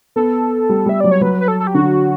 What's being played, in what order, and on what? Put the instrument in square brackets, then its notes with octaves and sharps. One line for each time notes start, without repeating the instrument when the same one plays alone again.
[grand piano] B3 [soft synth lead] A4
[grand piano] G3
[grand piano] G3 [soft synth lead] E5
[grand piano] F#3 [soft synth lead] D5
[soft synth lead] C#5
[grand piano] F#3 [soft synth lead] B4
[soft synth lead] B4
A4
A4
G4
[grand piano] D3 [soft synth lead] F#4